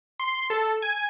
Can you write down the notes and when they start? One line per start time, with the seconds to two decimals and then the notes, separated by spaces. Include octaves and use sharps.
0.20 C6
0.50 A4
0.82 G#5